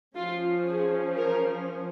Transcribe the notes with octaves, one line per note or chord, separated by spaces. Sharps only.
F3 C#4 F4
G#4
A#4